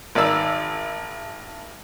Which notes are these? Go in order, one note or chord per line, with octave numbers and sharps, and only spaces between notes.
G#1 D#3 D5 E6